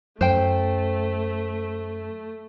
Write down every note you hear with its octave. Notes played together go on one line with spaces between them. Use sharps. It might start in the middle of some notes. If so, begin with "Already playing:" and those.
F#2 A3 C5 G5